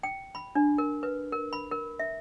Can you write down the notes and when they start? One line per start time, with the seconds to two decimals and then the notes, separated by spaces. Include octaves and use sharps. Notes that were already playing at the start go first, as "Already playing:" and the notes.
0.03 G5
0.35 B5
0.55 D4
0.78 A#4
1.03 B4
1.32 A#4
1.53 B5
1.71 A#4
1.99 E5